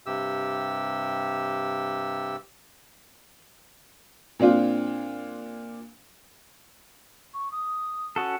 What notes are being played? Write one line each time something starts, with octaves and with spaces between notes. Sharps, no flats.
G2 C3 G4 E6
A#2 C4 D4 F4
C#6
D#6
C#4 F#4 A4